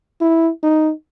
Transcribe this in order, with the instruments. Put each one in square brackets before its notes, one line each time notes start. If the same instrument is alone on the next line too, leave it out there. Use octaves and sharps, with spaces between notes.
[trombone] E4
D#4